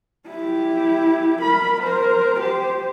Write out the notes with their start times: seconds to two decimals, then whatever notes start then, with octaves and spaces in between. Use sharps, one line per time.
0.27 E4 G4
1.41 A#4 B5
1.82 A#4 C5
2.40 G4 C5